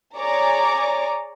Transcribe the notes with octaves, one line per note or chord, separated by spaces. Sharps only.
G#4 C#5 D5 A#5 D6